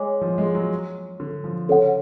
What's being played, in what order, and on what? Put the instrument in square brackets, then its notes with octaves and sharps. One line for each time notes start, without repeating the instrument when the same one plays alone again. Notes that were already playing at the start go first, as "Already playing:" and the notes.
Already playing: [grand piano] G#3 [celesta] C#5 G#5 D6
[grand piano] F3
G#3
F#3
D3
F3
[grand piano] C#3 [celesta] A4 C#5 F#5